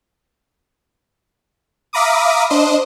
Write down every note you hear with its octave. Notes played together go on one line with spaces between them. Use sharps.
E5 F5 A#5 B5 D6 D#6
D4 C5 D#5